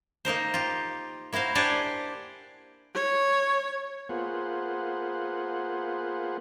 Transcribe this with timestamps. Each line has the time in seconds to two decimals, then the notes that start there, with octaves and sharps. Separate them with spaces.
0.25 A#3 D#4 A#4 C5
0.54 F4 G4
1.33 A#3 E4 F#4 C5 F5
1.55 D4 G4 C5 D5 F#5 G#5
2.95 C#5
4.09 A#3 B3 F4 G#4 C5 F#5